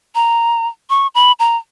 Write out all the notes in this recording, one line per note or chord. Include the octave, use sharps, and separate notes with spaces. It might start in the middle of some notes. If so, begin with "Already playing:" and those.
A#5
C#6
B5
A#5